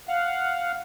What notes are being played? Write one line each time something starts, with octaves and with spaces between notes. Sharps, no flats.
F5 F#5